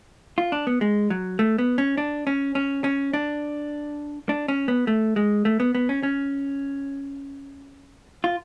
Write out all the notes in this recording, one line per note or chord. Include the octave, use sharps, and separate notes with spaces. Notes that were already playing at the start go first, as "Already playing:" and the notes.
F4
D4
B3
G#3
F#3
A3
B3
C#4
D4
C#4
C#4
C#4
D4
D4
C#4
B3
A3
G#3
A3
B3
B3
C#4
C#4
F4